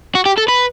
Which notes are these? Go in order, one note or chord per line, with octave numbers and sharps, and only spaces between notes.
F#4
G4
A4
B4